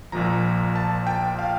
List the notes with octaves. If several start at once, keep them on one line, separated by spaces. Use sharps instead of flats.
A#1 A#2 F3 A#5
A5
G5
F5